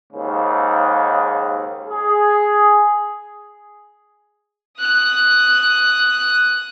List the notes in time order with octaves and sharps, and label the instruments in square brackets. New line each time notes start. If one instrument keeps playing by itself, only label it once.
[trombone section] D#2 G#2 C#3
G#4
[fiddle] D#6 F#6